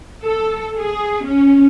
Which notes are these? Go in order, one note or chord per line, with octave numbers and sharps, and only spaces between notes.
A4
G#4
C#4